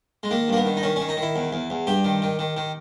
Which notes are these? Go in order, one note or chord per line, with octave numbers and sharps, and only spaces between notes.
G#3
D#3 A#3
G2 A#3
B3
D#3
D#4
D#3 C#4
D#3 C#4
D#4
D#3
E4
E2
E2
E2
G2 G4
D#3
D#3
D#3
D#3